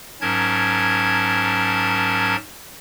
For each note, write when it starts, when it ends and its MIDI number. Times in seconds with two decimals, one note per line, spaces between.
0.21 2.36 44
0.21 2.36 54
0.21 2.36 61
0.21 2.36 70
0.21 2.36 81
0.21 2.36 92